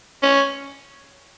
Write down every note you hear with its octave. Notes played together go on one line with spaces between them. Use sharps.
C#4